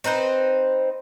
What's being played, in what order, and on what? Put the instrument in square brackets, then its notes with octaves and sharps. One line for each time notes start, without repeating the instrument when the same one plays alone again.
[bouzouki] C4 D#4 B4 C5